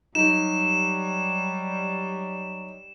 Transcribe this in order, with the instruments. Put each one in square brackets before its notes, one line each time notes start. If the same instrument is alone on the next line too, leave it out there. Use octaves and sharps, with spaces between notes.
[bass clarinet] F#3 [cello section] G3 [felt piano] D#4 [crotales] E7